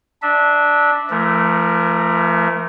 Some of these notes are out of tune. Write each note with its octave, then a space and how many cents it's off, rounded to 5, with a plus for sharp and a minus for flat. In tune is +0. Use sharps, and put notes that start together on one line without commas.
D4 +0 E5 -25
F3 -45 A3 +0 A#4 +0